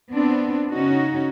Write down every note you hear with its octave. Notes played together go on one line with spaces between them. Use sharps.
B3 C4 D4
C#3 C#4 D#4 F#4